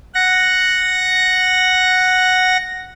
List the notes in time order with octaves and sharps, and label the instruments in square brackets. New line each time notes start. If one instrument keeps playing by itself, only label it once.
[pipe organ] F#5 A#6